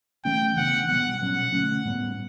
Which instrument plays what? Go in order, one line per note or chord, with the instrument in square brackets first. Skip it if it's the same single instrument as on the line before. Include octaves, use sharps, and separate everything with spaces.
[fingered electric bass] E3 A3 C#4 [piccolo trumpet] G5
[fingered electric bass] C#3 E3 B3 D4 [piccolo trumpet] F#5
[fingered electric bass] B2 G3 B3 [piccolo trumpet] F#5
[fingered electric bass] B2 F#3 C#4 [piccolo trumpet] F#5
[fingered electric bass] D3 A3 C#4
A2 G3 B3